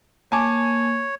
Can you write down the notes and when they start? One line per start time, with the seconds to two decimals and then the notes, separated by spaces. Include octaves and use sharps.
0.32 A#3 C#5 G#5 A5 D6